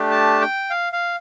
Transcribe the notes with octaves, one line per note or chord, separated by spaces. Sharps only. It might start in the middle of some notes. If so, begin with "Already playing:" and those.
Already playing: A3 D4 G4
A5
G5
F5
F5